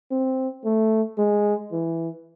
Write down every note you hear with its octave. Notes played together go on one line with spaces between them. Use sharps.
C4
A3
G#3
E3